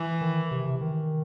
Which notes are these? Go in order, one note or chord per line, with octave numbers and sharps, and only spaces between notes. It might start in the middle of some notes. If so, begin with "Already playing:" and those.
Already playing: E3
D#3
C3
C3
D#3